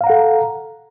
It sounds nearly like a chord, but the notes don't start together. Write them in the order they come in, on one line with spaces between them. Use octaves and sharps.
F5 A#5 F#5 A4